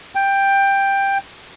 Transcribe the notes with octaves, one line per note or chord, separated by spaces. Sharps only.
G5